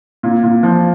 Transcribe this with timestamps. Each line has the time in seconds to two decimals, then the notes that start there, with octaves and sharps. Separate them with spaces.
0.23 A#2
0.43 A#2
0.63 F3